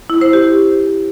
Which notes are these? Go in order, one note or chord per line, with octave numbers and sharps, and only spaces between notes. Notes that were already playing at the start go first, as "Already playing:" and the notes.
E4
C5
G4